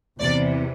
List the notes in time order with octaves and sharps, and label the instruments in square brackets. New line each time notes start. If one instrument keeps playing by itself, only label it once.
[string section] E2 C3 E3 D5